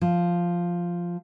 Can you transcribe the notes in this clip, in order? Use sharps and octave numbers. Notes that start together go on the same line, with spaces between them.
F3